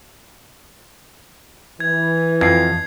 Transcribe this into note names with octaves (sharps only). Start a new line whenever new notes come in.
E3 G#6
F2 G#6 C7